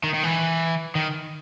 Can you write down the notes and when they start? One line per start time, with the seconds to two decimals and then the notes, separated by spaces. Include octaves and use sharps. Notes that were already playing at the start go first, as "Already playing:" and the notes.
0.04 D#3
0.14 D#3
0.23 E3
0.95 D#3